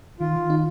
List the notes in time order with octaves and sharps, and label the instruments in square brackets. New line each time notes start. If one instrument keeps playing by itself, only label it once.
[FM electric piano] D#3 [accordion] F4
[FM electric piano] D#3
D#4